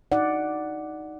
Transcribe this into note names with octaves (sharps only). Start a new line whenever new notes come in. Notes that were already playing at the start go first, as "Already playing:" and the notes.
D#4 D5 F#5